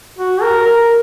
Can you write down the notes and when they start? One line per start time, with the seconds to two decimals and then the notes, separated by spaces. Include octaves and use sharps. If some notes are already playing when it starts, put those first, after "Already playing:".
0.18 F#4
0.42 A#4
0.66 A#4